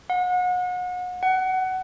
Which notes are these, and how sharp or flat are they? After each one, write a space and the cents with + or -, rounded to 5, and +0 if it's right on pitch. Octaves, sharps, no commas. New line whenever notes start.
F#5 -35
F#5 +20